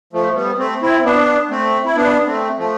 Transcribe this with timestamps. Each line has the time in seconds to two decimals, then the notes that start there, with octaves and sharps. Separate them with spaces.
0.13 F3 A3
0.35 G3 B3
0.58 A3 C4
0.82 C4 E4
1.04 B3 D4
1.50 A3 C4
1.85 E4
1.96 B3 D4
2.27 A3 C4
2.58 F3 A3